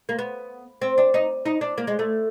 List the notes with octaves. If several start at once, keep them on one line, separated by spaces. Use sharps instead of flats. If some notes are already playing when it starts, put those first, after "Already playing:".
A#3
B3
C4
D4
D#4
D#4
D4
A#3
G#3
A3